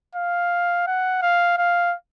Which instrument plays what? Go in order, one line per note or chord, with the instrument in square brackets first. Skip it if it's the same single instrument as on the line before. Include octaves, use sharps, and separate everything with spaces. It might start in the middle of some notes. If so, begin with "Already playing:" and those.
[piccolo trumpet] F5
F#5
F5
F5